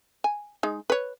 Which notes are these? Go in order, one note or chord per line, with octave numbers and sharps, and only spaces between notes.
G#5
G#3 D#4
B4 C#5